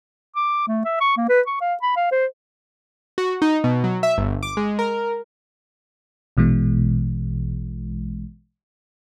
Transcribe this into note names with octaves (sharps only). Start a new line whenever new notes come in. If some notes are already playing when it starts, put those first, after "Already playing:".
D6
A3
E5
C#6
A#3
B4
C#6
F5
B5
F5
C5
F#4
D#4
B2
F#3
E5
G1
D6
G#3
A#4
A#1 B2 E3 G#3